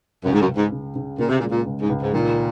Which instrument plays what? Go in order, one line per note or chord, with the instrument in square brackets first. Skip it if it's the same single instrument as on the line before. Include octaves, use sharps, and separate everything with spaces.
[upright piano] C#2 [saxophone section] F#2
[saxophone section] G#2
F#2
[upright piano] C#2
[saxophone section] G#2
[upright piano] C#3
C#3
[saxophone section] A#2 [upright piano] C#3
[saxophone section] C3
A#2
[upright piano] G#3
[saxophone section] A#2
[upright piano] C#2
[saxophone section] G#2
[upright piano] C#2
[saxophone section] G#2
[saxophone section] A#2 [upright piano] D#3